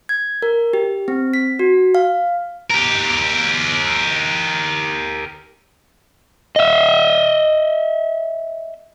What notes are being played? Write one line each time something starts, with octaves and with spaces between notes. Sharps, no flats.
G#6
A#4
G4
C4
B6
F#4
F5
G4 A#4
D#5 E5